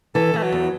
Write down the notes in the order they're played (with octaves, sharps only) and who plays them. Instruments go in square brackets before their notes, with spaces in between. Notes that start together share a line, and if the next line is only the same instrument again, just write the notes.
[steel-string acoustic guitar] E3 [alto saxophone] A4
[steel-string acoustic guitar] E3 [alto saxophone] A3
[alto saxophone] F#3
[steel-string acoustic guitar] E2